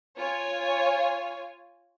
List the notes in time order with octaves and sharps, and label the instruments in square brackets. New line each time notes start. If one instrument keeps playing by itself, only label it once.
[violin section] F4 C#5 G#5